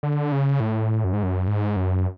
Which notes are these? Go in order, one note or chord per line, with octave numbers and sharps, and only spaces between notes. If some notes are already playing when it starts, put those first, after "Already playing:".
D3
C#3
A2
F#2
G#2
F#2
G#2
F#2